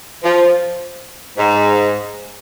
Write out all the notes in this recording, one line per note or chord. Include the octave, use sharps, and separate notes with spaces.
F3
G#2